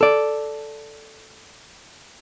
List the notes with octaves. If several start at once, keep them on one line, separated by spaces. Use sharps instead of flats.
A4 D5